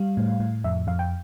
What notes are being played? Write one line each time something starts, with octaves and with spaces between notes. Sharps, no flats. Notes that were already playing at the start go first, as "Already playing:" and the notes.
Already playing: G3 F5
A2
A2
F2 E5
F2 F5
G5